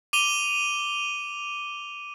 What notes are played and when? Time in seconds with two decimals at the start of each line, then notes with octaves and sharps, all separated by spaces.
0.13 D6 D#7 F7 G7